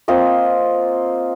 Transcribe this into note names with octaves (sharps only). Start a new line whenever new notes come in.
A#3 C4 F4 D#5